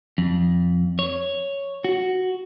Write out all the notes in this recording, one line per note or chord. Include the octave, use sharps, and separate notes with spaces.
F2
C#5
F#4